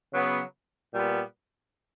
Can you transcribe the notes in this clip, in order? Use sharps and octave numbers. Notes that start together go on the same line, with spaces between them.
C#3 F#3 B3
A#2 G3 B3